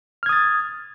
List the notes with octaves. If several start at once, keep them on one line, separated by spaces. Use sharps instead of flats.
D#6 F6 G#6 A6